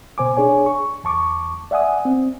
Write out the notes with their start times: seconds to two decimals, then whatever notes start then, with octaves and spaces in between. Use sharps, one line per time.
0.18 B2 C5 G#5 D6
0.37 D4 G#4 C#5 G#5
0.66 C#6
1.04 E2 A5 C#6 D6
1.71 D5 E5 F#5 G#5 D#6
2.05 C4